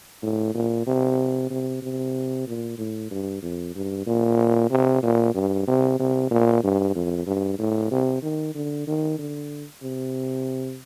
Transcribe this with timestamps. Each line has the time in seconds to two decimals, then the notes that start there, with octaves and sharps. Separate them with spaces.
0.23 A2
0.54 A#2
0.87 C3
1.50 C3
1.82 C3
2.47 A#2
2.78 A2
3.11 G2
3.42 F2
3.75 G2
4.06 A#2
4.70 C3
5.03 A#2
5.34 G2
5.67 C3
5.99 C3
6.31 A#2
6.63 G2
6.95 F2
7.26 G2
7.59 A2
7.91 C3
8.22 D#3
8.55 D3
8.87 D#3
9.18 D3
9.82 C3